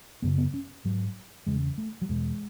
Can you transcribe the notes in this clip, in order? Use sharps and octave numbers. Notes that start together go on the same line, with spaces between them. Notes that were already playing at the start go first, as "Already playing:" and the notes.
F#2 C#3 B3
B3
C#4
G#2 F#3
E2 C#3 G#3
A3
F#3
E2 B2 G#3